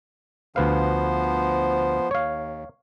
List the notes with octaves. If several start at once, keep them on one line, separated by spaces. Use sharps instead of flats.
D2 F3 B3 B4 C5 F5
D#2 C#5 F5